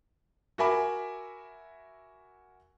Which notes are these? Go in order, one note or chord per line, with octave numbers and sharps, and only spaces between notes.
F#4 A#4 E5 G#5 B5 D6